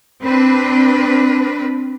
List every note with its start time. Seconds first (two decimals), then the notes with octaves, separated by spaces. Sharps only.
0.22 C4 D4 B4